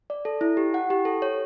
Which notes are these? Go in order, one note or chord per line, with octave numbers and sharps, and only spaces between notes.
D5
A4
E4
G4
F#5
G4
A4
C#5